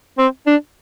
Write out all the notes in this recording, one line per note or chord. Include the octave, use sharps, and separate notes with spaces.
C4
D4